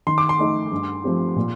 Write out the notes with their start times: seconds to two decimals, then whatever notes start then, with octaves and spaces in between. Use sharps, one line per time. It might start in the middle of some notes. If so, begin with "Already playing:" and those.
0.07 D#3 C6
0.18 D6
0.29 C6
0.39 A3 D#4 A4
0.72 G2
1.04 F3 A3 C4 G4
1.36 A#2